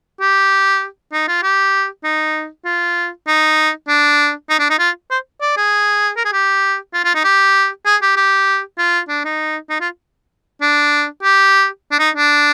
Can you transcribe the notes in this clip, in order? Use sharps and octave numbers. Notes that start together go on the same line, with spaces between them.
G4
D#4
F4
G4
D#4
F4
D#4
D4
D#4
D4
D#4
F4
C5
D5
G#4
A#4
G#4
G4
F4
F4
D#4
G4
G#4
G4
G4
F4
D4
D#4
D#4
F4
D4
G4
D4
D#4
D4